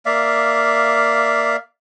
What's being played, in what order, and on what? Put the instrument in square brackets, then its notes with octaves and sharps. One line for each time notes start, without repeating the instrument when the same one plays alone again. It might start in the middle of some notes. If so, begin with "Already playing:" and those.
[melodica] A#3 D5 E5 F5